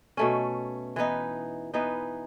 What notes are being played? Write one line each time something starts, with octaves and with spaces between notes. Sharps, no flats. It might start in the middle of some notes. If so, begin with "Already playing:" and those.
B2 A3 C#4
E3 B3 D#4
E3 B3 D#4